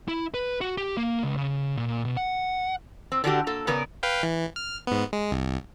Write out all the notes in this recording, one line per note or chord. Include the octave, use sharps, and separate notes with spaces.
E4
B4
F#4
G4
A#3
C#2
C#3
A#2
B2
F#5
C4
D3 D4 F#4 G4
A#3 A4
C#3 B3 A#4 D5
B4 F5 G5
E3
F6
G#2 B3
G#3
C2